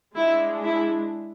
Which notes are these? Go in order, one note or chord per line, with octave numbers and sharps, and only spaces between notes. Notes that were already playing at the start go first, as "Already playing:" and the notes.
G#3 D4 E4
E4